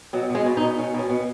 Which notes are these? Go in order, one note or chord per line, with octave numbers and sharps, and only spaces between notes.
B2 F#3
B2 G#3
B2
D#4
B2
B2 C#4
B2
C#4
B2